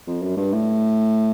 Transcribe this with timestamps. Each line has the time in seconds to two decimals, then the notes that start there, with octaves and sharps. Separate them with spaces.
0.07 F2
0.22 F#2
0.37 G2
0.52 A2